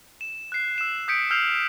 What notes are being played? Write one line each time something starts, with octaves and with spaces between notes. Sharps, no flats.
E7
F#6 C7
E6 E7
D#6 G6 B6 C#7 D7
E6 F6 G6 C7 F7